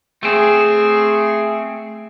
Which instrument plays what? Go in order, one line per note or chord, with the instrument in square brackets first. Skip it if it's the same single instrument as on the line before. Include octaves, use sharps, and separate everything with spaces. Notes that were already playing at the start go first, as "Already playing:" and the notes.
[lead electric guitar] A3 C4 [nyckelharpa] G#4